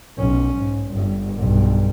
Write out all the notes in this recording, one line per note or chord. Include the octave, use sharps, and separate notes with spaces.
B1 C#4
G#2
G1 G2
B1 G2